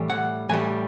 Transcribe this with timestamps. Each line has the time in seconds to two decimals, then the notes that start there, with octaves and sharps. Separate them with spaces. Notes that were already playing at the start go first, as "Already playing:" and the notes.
Already playing: A2 E3 G3
0.10 F#5
0.49 A2 E3 G3 G#5